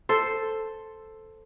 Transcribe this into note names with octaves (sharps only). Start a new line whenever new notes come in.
A4 C5